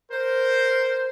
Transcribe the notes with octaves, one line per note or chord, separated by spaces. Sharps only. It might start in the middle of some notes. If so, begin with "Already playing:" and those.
A#4 C5